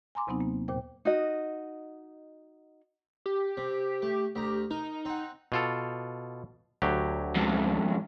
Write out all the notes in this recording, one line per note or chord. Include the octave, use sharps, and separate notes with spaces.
G#5 A#5 C6 D6
D#2 C3 F#3 B3 C4 D#4
A#3
D#2 A#2 C5 G5
D#4 F#4 D#5
G4
C3
A3
D2 G4 A#5
D#4 A#4
C4 F#5
B2 F4 A4
D2 F#3 G4
F2 G#2